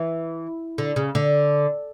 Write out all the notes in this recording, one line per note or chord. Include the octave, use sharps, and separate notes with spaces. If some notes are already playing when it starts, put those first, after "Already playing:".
Already playing: E3
D3
C#3
D3